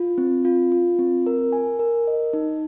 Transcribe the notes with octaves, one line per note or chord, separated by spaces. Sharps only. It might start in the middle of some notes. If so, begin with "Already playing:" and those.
Already playing: F4
C4
F4
F4
C4
A#4
G#5
A#4
D#5
D#4